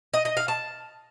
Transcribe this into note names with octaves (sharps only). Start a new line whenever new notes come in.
D#5
D#5
F5
A5